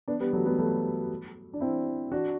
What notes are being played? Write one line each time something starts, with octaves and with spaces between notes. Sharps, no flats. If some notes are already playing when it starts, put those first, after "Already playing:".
B3 D4
G3 B3
F#3 A3
G3 B3
F#3 A3
D4
C4 E4
D4 F#4